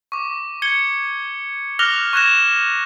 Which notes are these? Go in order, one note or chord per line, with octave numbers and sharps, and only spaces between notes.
C#6 D6
G#6 C#7 G7
D6 F6 F#6 A#6 F7 G7
C#6 F#6 G#6 A#6 E7